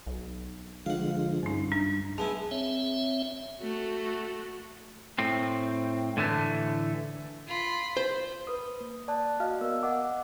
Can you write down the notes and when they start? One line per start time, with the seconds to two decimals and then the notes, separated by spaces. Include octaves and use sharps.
0.07 B1
0.86 D3 F3 G#3 F5 F#5
1.43 G2 C#4 D#4
1.72 D4
2.18 G#3 B3 E4 A5
2.51 C4 C#5 E5
3.60 A3 F#4
5.19 A2 C4
6.17 A2 D3 E3 A3
7.47 F4 B5
7.97 C5
8.47 B4 D#6
8.80 A#3
9.08 D5 A5 F#6
9.40 F#4 D#5 F5 F6
9.61 B3 A#4 E6
9.83 D#5 F#5 D6